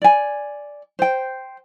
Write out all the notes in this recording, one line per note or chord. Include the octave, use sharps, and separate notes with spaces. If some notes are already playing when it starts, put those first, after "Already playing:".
D5 G#5
C5 G5